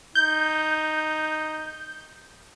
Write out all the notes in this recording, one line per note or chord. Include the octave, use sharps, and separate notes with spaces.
D#4 G6